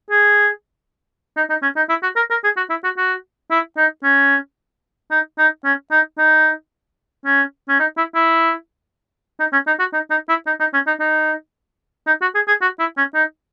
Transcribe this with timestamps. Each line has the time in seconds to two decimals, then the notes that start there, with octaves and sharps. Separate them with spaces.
0.11 G#4
1.37 D#4
1.50 D#4
1.62 C#4
1.76 D#4
1.89 E4
2.03 F#4
2.16 A#4
2.30 A#4
2.44 G#4
2.57 F#4
2.69 E4
2.84 F#4
2.97 F#4
3.51 E4
3.77 D#4
4.03 C#4
5.11 D#4
5.38 D#4
5.64 C#4
5.91 D#4
6.18 D#4
7.25 C#4
7.69 C#4
7.80 D#4
7.97 E4
8.15 E4
9.40 D#4
9.52 C#4
9.67 D#4
9.79 F#4
9.93 D#4
10.10 D#4
10.29 E4
10.46 D#4
10.60 D#4
10.73 C#4
10.87 D#4
11.00 D#4
12.07 D#4
12.21 F#4
12.35 G#4
12.48 G#4
12.62 F#4
12.79 E4
12.97 C#4
13.14 D#4